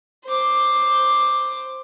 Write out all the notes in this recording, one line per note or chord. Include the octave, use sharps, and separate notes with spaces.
C5 D6